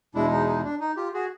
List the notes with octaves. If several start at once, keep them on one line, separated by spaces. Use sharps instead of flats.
E2 B2 G#3 D4 E4
D#4
D#4
D4
D#4
F4 G4
F#4 G#4